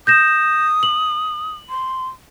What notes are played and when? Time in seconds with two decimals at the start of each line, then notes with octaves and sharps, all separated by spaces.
0.07 D#6 G6 A#6 E7
0.83 F#7
1.69 C6